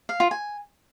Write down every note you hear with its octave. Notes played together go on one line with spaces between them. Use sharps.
F5
F4
G#5